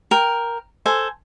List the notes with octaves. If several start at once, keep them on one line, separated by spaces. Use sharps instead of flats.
A#4 G5
A4 C5 G#5